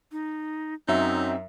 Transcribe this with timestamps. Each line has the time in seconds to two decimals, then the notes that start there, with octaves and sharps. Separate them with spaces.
0.12 D#4
0.88 F#2 F#3 C4 D#4 E5